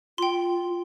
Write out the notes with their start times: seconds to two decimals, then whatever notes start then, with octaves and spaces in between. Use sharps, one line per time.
0.18 F4 G5 C6